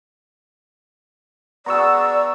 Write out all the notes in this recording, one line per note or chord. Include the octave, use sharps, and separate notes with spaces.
B3 F#4 G#4 D5 A#5 C#6 E6